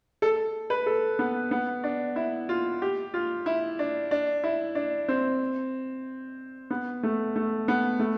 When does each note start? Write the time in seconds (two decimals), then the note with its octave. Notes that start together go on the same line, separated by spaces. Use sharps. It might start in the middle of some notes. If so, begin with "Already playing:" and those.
0.22 A4
0.70 B4
0.86 A4
1.19 B3
1.51 B3
1.84 D4
2.16 E4
2.49 F4
2.82 G4
3.14 F4
3.46 E4
3.79 D4
4.11 D4
4.44 E4
4.75 D4
5.08 C4
6.70 B3
7.03 A3
7.36 A3
7.68 B3
7.99 A3